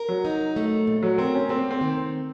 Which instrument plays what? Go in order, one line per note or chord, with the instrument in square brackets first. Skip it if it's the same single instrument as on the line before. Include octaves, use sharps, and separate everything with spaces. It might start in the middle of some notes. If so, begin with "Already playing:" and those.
Already playing: [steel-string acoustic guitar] A#4
[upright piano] F#3
[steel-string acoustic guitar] D#4
A3
A#2
[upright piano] F#3
[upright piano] C4 [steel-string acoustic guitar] A#4
[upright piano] C#4
[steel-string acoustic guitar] A#3 [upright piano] C4
[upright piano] C4
[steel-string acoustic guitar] D#3